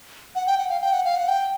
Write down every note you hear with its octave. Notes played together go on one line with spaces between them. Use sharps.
F#5
G5
F#5
F5
G5
F#5
F5
F#5
G5